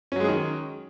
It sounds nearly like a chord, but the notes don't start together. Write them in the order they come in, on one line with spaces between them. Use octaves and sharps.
C#4 F#3 G#3 G#4 D#3